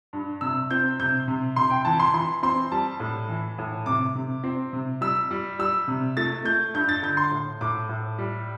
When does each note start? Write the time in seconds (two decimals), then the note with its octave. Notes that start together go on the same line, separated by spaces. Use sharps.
0.13 G2
0.41 C3 E6
0.70 C4 G6
1.00 C3 G6
1.28 C3
1.56 C3 C6
1.70 G5
1.85 E3 A5
1.99 C6
2.14 E3 C6
2.43 C4 C6
2.72 G3 A5
3.00 A2
3.29 E3
3.58 A2
3.86 C3 D6
4.15 C3
4.44 C4
4.73 C3
5.01 G3 E6
5.31 G3
5.59 G3 E6
5.88 C3
6.17 A3 A6
6.45 A3 G6
6.74 G2 G6
6.89 A6
7.03 D3 G6
7.17 C6
7.31 A2
7.61 A2 D6
7.89 A2
8.18 G3